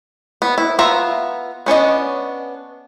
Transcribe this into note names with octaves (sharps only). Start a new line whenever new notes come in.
B3
E4
B3 F4 E5 A#5
B3 C#4 D4 D#5